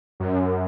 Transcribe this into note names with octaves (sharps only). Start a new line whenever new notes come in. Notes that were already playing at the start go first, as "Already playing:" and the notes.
F#2